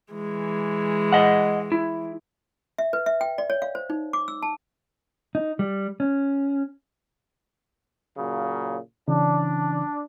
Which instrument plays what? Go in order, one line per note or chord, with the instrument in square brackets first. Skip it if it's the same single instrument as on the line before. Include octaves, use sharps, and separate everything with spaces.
[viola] E3 G#3
[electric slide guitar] D#5 F#5
E4
[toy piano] E5
B4
E5
G5
D5
C#5
F5
C5
D#4
D6
E6
A5
[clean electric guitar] D#4
G3
C#4
[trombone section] A#2 C#3 F#3
[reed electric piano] C#3 E3 C#4 [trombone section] D4